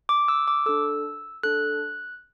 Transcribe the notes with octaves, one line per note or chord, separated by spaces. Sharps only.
D6
E6
D6
D4 A4 E6
D4 A4 F#6